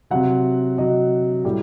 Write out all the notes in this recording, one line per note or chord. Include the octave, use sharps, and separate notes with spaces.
C3 F#3 F#5
C3 F#3 D#5
A2 G3